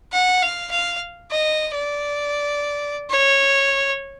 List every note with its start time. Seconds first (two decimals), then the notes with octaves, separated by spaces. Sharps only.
0.12 F#5
0.42 F5
0.71 F5
1.30 D#5
1.75 D5
3.10 C#5